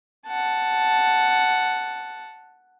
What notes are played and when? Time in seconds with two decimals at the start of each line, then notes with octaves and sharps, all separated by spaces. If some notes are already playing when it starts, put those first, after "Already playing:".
0.28 F#5 A5